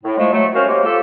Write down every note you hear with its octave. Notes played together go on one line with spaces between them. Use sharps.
A2
F3 G#3 A3
F#3 A3
C4 C#4 F#4 A#4 C5 F5
C3 F#3 G#3 A#3
F4 G4 A4